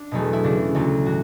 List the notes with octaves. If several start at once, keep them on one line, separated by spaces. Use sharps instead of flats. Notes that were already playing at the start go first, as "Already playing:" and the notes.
Already playing: D4
E2 B2 F#3 A3
E4
E2 C#3 E3 D4
D2 D3 F#3 A3
A2 E3 F#4